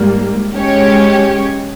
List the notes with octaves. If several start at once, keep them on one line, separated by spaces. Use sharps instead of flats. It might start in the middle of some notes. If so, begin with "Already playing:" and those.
Already playing: G#2 G3 A#3
G#3 C#4 G4 C#5